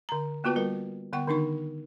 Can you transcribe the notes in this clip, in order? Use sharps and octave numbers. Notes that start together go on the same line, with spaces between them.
D3 A#5
A#3 B3 F4 F#4 B4 A5
G3 A#4 B4
D3 B3 F#5 C#6
D3 D#3 D4 D#4 C#6